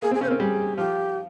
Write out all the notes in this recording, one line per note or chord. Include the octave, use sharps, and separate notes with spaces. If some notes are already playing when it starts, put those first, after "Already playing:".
A#3 G#4
C4
G#4
C#3 C#4 C5
C4 A#4
G3 G4 G#4
F3 F4 G4